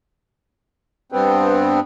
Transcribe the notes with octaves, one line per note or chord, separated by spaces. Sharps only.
G2 B3 C4